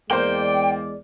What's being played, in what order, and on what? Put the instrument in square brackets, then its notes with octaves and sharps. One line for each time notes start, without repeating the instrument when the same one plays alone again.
[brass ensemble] E2 G#3 D5 [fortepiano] A#3 C5 [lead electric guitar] G5